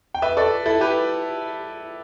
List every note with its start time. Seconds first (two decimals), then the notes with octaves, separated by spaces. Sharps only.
0.14 G5
0.22 B4 E5
0.37 A4 D5
0.66 E4 A4
0.81 G4 B4